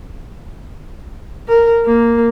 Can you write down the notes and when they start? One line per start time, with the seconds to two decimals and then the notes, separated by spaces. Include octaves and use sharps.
1.48 A#4
1.85 A#3